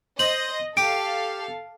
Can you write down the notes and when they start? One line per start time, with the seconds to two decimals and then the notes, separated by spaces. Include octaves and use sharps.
0.19 C5 D#5 F#7
0.77 G4 A4 F5 D7